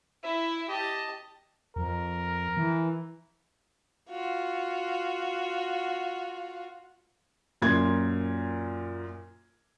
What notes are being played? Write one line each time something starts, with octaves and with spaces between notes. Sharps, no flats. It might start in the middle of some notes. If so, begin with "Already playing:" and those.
E4 E5
G4 D#5 A5
F2 A#4
E3
F4 F#4
F#2 A#2 A#4 C6 G#6